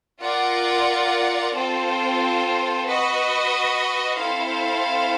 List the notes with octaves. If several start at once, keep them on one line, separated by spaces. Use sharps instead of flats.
F4 A#4 D5 F#5
C4 F4 A4 C5
F#4 B4 D#5
C4 E4 A4 C5 F5